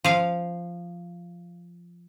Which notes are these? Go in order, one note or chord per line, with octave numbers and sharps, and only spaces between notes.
F3 F5